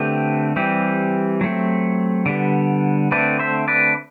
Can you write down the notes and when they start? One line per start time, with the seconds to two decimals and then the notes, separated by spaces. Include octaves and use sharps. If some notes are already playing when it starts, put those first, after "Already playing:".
Already playing: D3 A3 C4 G4 B4
0.56 E3 G3 C4 G4
1.41 F#3 A3 C4
2.26 D3 G3 B3
3.11 D3 A3 C4 B4 D5
3.39 C5 E5
3.68 B4 D5